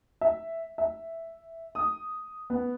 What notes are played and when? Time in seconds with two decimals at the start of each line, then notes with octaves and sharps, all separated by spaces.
0.21 E5
0.78 E5
1.75 D#6
2.50 B3